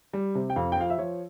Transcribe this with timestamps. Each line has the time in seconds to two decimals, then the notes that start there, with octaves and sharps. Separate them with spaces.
0.13 G3
0.35 C3
0.50 G5
0.56 F2 F5
0.72 G5
0.77 F3 F5
0.90 E5
0.98 F3 C#5